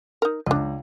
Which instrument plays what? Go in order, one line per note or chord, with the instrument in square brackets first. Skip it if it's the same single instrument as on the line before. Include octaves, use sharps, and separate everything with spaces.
[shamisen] D#4 A#4
[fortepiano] C#2 [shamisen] D4 D#5